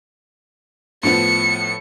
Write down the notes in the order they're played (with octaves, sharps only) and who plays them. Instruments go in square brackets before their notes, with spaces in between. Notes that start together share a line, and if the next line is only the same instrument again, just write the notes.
[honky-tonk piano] A2 F3 B3 [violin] C#7